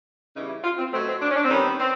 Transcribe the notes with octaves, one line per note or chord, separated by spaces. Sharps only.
C#3 E3 G3 B3 D#4
E4
F4
C4
B2 F#3 A3 C4
C4
D4
C#4
D4
C4
D#3 G3 B3 C#4
C4